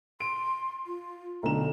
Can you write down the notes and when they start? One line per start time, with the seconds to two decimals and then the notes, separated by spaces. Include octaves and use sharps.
0.20 C6 D7
0.87 F4
1.43 B1 D3 A#5 E7